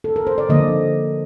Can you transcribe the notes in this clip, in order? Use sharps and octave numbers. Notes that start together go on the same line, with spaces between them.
A4
A#4
C5
D5
D3 F3 A#3 D#5